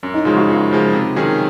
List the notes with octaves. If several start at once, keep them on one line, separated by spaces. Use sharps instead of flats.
F#2 C#4
D#4
C#3 F3 G#3 F4
F#4
F#2 F4
C#3 F3 G#3
C3
D#3 F#3 C#4 G#4